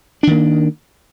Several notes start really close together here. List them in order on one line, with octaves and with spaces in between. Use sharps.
D4 D#3 A#3